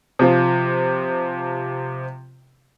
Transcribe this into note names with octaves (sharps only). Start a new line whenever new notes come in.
C3 F3